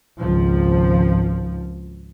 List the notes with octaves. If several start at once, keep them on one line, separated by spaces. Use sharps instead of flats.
G#1 C#2 F3